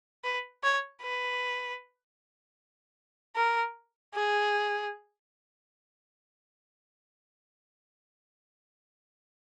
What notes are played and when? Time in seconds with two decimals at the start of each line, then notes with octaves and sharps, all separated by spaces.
0.24 B4
0.64 C#5
1.02 B4
3.36 A#4
4.15 G#4